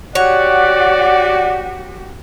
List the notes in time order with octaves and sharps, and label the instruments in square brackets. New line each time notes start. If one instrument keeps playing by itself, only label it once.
[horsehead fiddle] F#4 G4 [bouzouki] C#5 [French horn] D5 [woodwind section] F#5